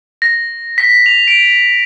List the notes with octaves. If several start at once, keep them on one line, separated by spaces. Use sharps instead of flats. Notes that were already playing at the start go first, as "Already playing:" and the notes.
A#6
B6
F7
D7